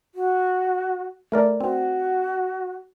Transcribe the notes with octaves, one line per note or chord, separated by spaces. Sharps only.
F#4
A3 A#4 D5
C4 F#4